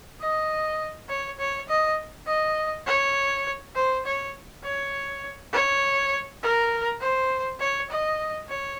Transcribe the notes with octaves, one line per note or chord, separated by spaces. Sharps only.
D#5
C#5
C#5
D#5
D#5
C#5
C5
C#5
C#5
C#5
A#4
C5
C#5
D#5
C#5